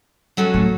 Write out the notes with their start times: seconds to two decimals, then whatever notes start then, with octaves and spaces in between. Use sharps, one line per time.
0.37 F#3 C#4 F#4 A4 C#5
0.54 A2